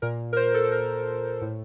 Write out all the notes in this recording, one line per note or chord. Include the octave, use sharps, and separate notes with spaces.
A#2 A#4
A#4
C5
A4
A#4
A2